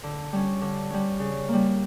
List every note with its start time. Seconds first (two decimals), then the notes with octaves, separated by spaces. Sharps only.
0.03 D3
0.33 G3 C#4
0.61 D3
0.90 G3 C#4
1.20 C#3
1.48 G3 A#3